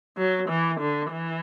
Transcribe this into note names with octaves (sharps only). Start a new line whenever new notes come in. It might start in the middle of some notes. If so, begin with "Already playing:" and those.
F#3
E3
D3
E3